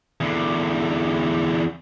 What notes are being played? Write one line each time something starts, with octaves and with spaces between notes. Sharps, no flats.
E2 D3